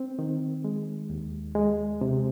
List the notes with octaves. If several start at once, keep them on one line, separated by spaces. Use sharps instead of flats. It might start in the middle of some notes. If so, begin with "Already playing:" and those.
Already playing: C4
D#3
G#3
D#2
G#3
C3